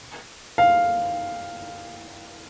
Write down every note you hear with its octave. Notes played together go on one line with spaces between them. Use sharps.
F5